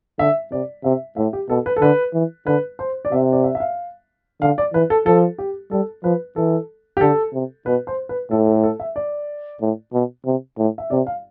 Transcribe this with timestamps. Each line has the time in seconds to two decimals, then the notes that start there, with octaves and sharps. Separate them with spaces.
0.19 D3 E5
0.52 C3 D5
0.84 C3 E5
1.16 A2 E5
1.33 G4
1.49 B2 A4
1.66 B4
1.76 A4
1.81 D3 B4
2.14 E3
2.46 D3 B4
2.79 C5
3.05 D5
3.12 C3 E5
3.32 D5
3.44 E5
3.55 E5
3.60 F5
4.41 D3 F5
4.58 D5
4.73 E3 B4
4.90 A4
5.06 F3 A4
5.38 G4
5.71 G3 A4
6.04 F3 B4
6.36 E3 A4
6.97 G4
7.01 D3 A4
7.33 C3
7.66 B2 B4
7.87 C5
8.09 B4
8.31 A2 A4
8.47 A4
8.63 A4
8.80 E5
8.96 D5
9.61 A2
9.93 B2
10.25 C3
10.58 A2
10.78 E5
10.90 C3 D5
11.07 F5